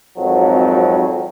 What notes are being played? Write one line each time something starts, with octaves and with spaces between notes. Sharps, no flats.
G#1 F2 F#3